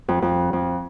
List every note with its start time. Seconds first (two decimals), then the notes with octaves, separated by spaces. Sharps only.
0.08 F2
0.22 F2
0.53 F2